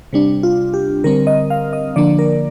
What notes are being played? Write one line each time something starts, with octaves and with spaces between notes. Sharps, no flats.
C3 G3 D4
F4
G4
D3 G3 C4 A#4
D#5
F5
D#5
D3 F3 A#3 D4 D5
A#4